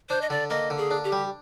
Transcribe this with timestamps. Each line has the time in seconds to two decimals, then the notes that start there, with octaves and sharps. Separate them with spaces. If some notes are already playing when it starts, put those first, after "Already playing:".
0.09 D4 C5
0.21 D#5
0.30 D3 D5
0.50 A#3 D#5
0.70 D3
0.78 G#4
0.91 D4
1.04 G4
1.12 G3